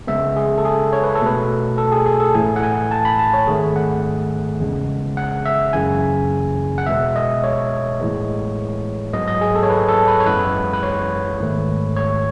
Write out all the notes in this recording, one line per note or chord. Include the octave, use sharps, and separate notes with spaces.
C#3 G#3 B3 E5
G#4
A4
G#4
C#5
B4
A4
B2 A3 B4
A4
G#4
G#4
A4
A2 E3 A3 G#5
F#5
G#5
A5
B5
A5
C#5
G#2 D#3 A3 G#4
F#5
E2 C#3 G#3
F#5
E5
F#2 C#3 E3 G#5
F#5
E2 B2 G#3 B3 E5
D#5
C#5
A2 E3 G#3 B3
G#2 F#3 B3 D#5
D#5
G#4
A4
C#5
B4
A4
B4
C#5
F#2 E3 G#3 B3 B4
B4
C#5
G#2 D#3 A3
C#5